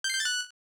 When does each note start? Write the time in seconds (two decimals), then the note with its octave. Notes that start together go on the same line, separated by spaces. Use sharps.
0.04 G6
0.10 C7
0.15 G6
0.20 A6
0.25 F#6